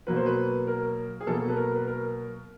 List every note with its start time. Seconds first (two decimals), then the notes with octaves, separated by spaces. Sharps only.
0.07 B2 F#3 A#3 B4
0.16 C5
0.26 B4
0.67 A#4
1.21 G#4
1.27 B2 F#3 A#3 A4
1.48 B4
1.56 A#4
1.76 B4
1.87 A#4